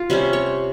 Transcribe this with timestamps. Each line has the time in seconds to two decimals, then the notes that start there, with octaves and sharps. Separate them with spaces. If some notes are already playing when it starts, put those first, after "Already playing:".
Already playing: F4
0.10 C3 G3 C#4 G4
0.33 C#5